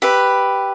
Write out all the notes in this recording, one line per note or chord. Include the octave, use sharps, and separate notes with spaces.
G4 B4 E5